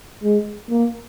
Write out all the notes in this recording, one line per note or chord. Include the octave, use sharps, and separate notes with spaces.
G#3
A#3